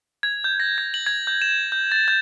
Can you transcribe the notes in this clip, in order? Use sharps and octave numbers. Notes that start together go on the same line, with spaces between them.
G#6
G6
A#6
G#6
F#7
G#6
G6
E7
G6
A6
G6